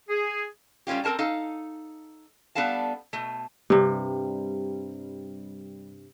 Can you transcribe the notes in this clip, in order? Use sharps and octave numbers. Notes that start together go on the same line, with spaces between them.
G#4
G3 A3 C#4 F4 G4
C4 A4 A#4 A5 A#5
D#4 A4 F5
G3 B3 D4 A4 F5 A5
B2 A3
G2 C3 G3